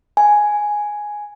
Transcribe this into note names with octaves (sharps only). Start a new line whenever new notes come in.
G#5